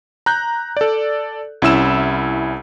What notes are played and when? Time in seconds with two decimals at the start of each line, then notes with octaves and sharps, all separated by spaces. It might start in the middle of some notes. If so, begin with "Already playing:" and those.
0.26 A#5 F#6 G6
0.77 A4 D5
1.62 C2 C#4 E4 E6 E7